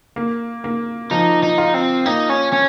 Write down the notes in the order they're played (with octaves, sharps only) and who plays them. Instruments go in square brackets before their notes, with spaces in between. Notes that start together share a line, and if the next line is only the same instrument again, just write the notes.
[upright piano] A#3
A#3
[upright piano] F3 [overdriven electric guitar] D#4
[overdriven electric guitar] D#4
[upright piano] F4
[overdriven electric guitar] C4
[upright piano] A#3 [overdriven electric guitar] D#4
[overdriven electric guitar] C#4
C#4